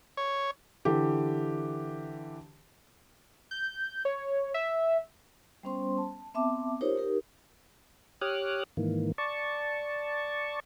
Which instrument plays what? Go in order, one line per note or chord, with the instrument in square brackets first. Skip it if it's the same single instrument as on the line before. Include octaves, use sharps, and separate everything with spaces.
[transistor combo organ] C#5
[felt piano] D3 E3 G4
[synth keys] G6
C#5
E5
[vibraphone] G3 B3 C#4 C5 C6
A5
B3 C4 E5 A5 D6
D#4 F4 G4 A#4 C5 C#5
D#4 G4 A#4
[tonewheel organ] G4 C#5 D6 D#6 F6 F#6
G#2 D#3 E3 A#3
D5 A5 C#6